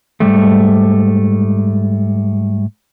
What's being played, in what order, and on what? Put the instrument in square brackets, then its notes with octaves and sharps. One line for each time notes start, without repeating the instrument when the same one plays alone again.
[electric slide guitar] G#2 C3 G3 A3